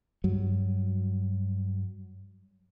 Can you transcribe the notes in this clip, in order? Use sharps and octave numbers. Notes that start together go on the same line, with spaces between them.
G2 F#3